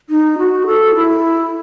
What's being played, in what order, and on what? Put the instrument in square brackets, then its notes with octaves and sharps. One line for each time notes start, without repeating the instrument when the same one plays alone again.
[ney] D#4
F#4
A4
E4